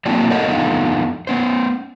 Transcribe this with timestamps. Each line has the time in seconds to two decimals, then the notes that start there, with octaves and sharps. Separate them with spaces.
0.06 F#3 A#3 C4 D4 E4
0.30 A4 A#4 C5 C#5 D#5 F#5
0.48 F2 D3 B3 D#4 F4
1.27 B3 C#4 C5